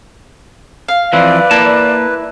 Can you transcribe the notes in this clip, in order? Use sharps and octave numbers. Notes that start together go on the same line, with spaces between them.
F5
E3 F3 C4 B4 D5
A#3 E4 A5